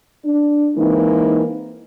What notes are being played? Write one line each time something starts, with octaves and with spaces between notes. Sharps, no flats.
D4
E3 G#3 A#3 C4 D#4